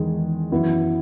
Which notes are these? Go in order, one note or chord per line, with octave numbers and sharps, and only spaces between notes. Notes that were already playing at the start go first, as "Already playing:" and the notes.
Already playing: E2 D#3 G#3
F#2 E3 B3 E4